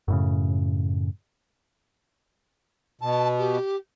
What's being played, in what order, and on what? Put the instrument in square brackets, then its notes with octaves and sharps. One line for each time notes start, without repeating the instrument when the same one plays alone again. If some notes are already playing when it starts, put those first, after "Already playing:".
[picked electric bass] F#2 A2 C#3
[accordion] B2 [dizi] A5
[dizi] G4